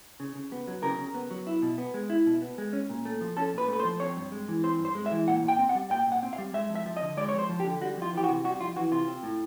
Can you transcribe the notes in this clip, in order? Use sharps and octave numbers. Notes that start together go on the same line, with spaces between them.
C#3
C#3
B3
F#3
C#3 A#4
C#3
B3
F#3
E4
B2
B3
G#3
E4
B2
B3
G#3
C#4
A#2
A3
F3
C#4 A4
A#2 B4
A3 B4
C5
F3
C4 C#5
G2
G#3
E3
C4 C5
G2
C5
G#3
E5
E3
A#2 F#5
A#2
G5
C4
F#5
G3
A#2 G5
A#2
F#5
C4
F5
G3
G#3 E5
F2
E5
F3
D#5
D3
G#3 D5
C#5
F2
C5
F3
G4
D3
G3 F#4
F2 F4
E3
G4
F#4
C3
G3 F#4
F2 F4
E3 F#4
C3 F4
C4
A2